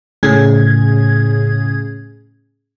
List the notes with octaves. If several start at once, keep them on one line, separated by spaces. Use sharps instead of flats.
A2 C#3 C#4 G#4 G#6